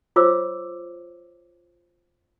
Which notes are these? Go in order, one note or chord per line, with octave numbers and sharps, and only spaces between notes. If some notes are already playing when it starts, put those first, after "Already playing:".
F4 C5 C#5 D6 E6